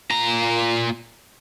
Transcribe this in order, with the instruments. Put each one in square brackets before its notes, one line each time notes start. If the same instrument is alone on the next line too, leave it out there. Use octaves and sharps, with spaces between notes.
[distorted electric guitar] A#2 A#5